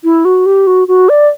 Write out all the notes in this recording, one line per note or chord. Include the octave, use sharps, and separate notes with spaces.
E4
F#4
G4
F#4
F#4
D5